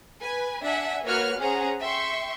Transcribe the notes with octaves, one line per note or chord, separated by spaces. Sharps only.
B4 G#5
D4 E5 F#5 G#5
A#3 F#4 B4 C#5 F6 F#6
C#4 G#4 C5 F#5 A#5
E5 G5 C6 C#6